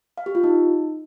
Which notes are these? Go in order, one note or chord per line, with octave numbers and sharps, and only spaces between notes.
F5
G4
F4
D#4